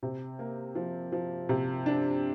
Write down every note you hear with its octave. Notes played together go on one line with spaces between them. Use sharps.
C3
A#3
F3
F3
C3
D4